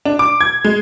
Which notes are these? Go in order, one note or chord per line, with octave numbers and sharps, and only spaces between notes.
D4
D6
G#6
G#3